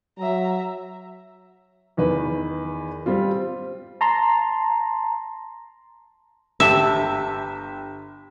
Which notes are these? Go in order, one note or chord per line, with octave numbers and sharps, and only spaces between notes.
F#3 E5 A#5
E2 D#3 B4
G3 C4 F4
A5 A#5 C6
G1 G4 E5 A5